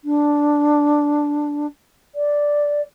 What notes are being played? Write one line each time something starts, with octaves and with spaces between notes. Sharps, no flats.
D4
D5